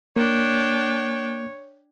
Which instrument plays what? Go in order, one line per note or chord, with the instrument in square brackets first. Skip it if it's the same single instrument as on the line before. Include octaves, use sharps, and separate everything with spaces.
[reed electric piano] A#3 [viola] D4 G5 [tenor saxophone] C#5